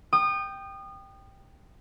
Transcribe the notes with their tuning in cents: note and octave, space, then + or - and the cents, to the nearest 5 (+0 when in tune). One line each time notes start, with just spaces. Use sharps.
G5 +0 D#6 -30